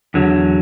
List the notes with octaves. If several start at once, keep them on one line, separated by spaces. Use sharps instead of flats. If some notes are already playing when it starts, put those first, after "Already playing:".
E2 D3 F#3